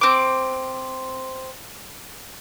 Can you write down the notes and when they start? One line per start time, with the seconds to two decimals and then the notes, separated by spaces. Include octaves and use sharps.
0.01 C4 D6